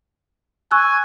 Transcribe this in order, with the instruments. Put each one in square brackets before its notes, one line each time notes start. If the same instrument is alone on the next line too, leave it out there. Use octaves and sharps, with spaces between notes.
[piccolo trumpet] G#5 [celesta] C#6 E6 F#6